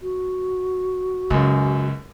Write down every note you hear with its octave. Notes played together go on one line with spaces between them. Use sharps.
F#4
C#2 F#2 C#3